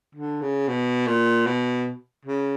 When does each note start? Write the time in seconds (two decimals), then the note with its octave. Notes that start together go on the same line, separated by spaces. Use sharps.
0.15 D3
0.42 C#3
0.68 B2
1.07 A#2
1.47 B2
2.25 C#3